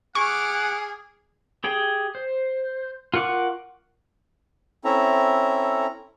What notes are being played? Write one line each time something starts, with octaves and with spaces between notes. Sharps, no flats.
G#4 F#5 C#6 D6 F6
G4 G#4 G5
C5
F4 A#4 F#5 C#6 D6
C4 C#4 E4 A4 E5 A#5